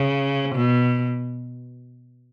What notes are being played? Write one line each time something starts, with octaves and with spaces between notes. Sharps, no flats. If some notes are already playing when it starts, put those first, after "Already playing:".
Already playing: C#3
B2